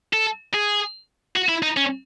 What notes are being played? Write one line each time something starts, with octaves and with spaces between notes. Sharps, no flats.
A4
G#4
F#4
E4
D#4
C#4